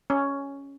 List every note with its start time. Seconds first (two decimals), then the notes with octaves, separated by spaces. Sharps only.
0.10 C#4